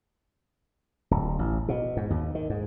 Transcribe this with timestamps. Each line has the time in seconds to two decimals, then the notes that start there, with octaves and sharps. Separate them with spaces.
1.11 D1
1.39 A1
1.68 B2
1.97 G#2
2.10 D#2
2.35 D#3
2.50 G#2